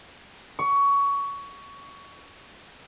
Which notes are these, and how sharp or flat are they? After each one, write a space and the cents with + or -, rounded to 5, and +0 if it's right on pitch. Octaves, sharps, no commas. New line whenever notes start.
C#6 +20